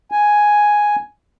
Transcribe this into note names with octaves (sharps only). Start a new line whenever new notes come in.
G#5